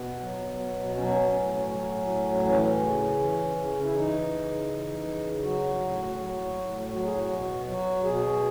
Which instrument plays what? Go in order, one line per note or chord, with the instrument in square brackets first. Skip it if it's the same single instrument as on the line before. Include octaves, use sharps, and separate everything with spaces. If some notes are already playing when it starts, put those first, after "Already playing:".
Already playing: [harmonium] B2 B3
F#3
B2
F#3 C#4
B3
C#4
A2
F#3
A2
E3 C#4
C#3
E3
C#3
E4
E3 D#4
C#3
E3
C#3
F#3 F#4
A2
F#3
A2
F#3 F#4
G#4
F#4
B2
F#3 F#4
B2 G#4